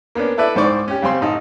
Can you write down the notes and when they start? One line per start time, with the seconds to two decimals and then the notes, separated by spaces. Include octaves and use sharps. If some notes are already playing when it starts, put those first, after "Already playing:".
0.15 A#3 B3 C#4 D4
0.38 E4 A4 B4 D5 E5
0.55 C2 G#2 C5 D5 C#6
0.88 C#4 G4
1.02 C#3 G3 C4 C6
1.21 A1 D#4 A5